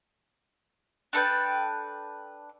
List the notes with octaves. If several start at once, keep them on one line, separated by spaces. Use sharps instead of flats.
D4 A4 B4 G5